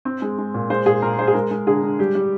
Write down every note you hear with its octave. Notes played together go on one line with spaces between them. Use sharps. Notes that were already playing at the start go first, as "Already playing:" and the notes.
C4
G#3
G#3
A#2
G#3 C5
A#2 G#4
A#2 A#4
G#3 C5
G#4
G#3 A#4
G#3
D3 G#4
G#3
G3 G4
G3